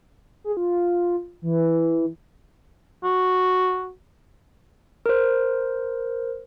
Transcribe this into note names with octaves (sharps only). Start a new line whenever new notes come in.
G#4
F4
E3
F#4
A#4 C5